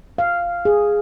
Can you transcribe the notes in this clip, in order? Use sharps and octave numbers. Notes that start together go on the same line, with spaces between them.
F5
G#4